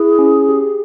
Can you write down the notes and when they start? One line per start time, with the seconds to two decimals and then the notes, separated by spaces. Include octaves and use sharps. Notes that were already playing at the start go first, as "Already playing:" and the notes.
Already playing: E4 G#4
0.19 C#4
0.49 G4